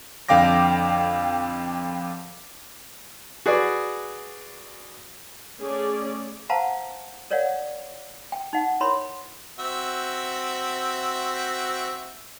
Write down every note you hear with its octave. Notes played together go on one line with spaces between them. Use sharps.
F2 D3 F5 G5 D6 A#6
F#4 G#4 B4 D5
A3 C#4 G#4 D5
B4 C5 F5 F#5 A5 A#5
A#4 C#5 D5 F5 F#5
G5
D#4 F#5
E4 A#4 C#5 B5 C6
C4 F#4 E5